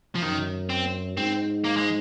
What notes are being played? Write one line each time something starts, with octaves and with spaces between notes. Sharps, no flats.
F3
F#2 D#3
C4
G#2 C4
A#3
G#3